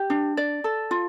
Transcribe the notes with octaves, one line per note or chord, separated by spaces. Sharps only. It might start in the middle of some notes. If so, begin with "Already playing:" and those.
Already playing: G4
D4
D5
A4
F4